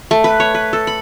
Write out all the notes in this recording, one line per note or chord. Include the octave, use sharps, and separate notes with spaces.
A3
B4
C#5
B4
A4
B5